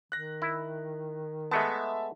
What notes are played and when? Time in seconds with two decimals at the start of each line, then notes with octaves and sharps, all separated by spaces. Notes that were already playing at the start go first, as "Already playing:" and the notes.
0.12 D#3 F#6 A#6
0.42 E4
1.51 G#3 A3 B3 E5 A5